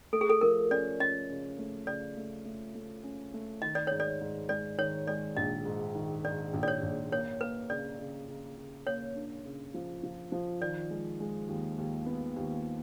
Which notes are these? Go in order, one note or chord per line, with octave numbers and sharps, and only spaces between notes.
A3 A4
G#4
A4
F3 A#4
C#4 D5
C#4 D#5
C#3
A3
C#3 D5
A3
A3
A3
C#4
A3
D#3 D#5
D5
G#2 C#5
D5
G#2
G#3 D5
D#3 C#5
G#3 D5
A#1 D#5
G#2
D#3
G#2 D5
A#1
D5
C#5
A#1
A#3 C#5
A#3 B4
C#3 D5
C#3
C#3
C#3
A#3 C#5
D4
C#3
F3
F3
F3
D#3 D5
G#3
G#3
D#2
D#2
B3
D#2